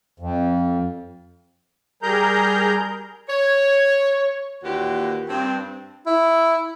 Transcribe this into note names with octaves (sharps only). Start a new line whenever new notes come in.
F2
G3 G#4 A#4 A#5 G6
C#5
D#2 A#2 E3 F#4 G4
G2 C4
E4